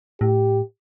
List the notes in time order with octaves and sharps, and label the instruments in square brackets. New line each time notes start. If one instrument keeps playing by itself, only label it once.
[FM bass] A2 [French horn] G4